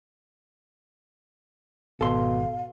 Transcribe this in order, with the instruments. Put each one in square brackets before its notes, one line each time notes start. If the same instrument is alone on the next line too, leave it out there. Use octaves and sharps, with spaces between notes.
[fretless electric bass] G#1 [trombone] B2 [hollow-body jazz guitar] A4 C6 [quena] F5